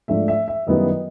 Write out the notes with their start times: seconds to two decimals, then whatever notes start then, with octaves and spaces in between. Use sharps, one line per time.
0.08 G#2 F3 A3 D4 E5
0.28 E5
0.48 E5
0.67 F#2 D#3 G3 B3 E4 D#5